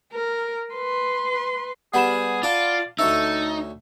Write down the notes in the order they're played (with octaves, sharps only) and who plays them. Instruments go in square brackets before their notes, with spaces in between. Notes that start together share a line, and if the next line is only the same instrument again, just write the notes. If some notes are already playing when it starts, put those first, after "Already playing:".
[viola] A#4
B4 C6
[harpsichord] G3 B3 [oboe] G#4 [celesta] F#5 B5 E7
[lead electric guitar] F4 [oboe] D5 [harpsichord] A5
[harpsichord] D2 C#5 E5 [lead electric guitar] D#4 [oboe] A4 [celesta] E6